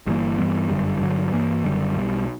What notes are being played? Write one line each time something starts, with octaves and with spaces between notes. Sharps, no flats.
G1 G2 E3 A#3
G2 E3 G3 B3
G1 F#2 D3 G3
G2 D3 F#3
G2 E3 A#3
F#1 F#2 D3 G3
B1 B2 G3